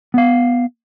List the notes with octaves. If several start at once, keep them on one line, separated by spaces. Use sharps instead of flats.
B3 F5